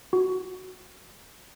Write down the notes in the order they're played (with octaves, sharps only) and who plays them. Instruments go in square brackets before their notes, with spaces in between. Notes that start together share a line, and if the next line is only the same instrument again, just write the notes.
[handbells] F#4